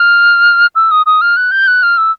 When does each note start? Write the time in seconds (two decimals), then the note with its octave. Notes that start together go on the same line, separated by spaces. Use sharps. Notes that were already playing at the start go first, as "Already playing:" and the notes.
Already playing: F6
0.75 E6
0.91 D#6
1.06 D#6
1.21 F6
1.36 F#6
1.51 G6
1.67 F#6
1.83 F6
1.97 E6